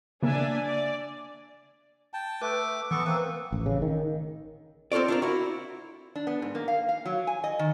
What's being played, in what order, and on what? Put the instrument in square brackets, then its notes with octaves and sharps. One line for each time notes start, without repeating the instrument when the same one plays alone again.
[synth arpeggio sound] C#3 A#3 [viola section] D4 E5 G#5
[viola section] D5
[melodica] G5 A5
[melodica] A3 D6 [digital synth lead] B4
[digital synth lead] E3 [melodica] B3 A4 C#6
[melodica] A#3 C4 [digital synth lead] B4
[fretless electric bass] A1
C#3
D#3
[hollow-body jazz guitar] C4 F4 A4 C#5 D5
D4 F4 A#4
E4 F#4
[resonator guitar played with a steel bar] D4
B3
G#2
A#3
F5
F5
F#3
G#5
D#5
D#3